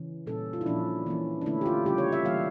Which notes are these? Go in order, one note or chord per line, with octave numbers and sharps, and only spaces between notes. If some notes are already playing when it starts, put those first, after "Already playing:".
Already playing: C#3 E3 C#4
A#2 G3 C#4 A4
F4
E4
A#2 F3 C#4 D4
E3 A#3 C#4
D4
D3 A3 C#4 E4
G4
F4
C#3 G3 C#4 G4
C#5
E5
E3 G3 A#3 F5